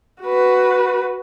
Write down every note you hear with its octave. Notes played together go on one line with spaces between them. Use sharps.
F#4 B4